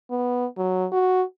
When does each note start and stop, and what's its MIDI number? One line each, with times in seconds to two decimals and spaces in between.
0.10 0.46 59
0.57 0.87 54
0.92 1.22 66